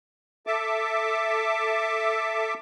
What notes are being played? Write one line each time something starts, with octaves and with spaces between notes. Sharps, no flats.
A4 E5 A5 D6